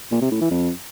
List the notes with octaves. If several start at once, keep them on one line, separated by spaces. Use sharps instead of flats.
A#2
C3
A2
E3
F2